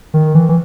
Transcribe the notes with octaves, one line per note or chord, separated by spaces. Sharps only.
D#3
E3
E3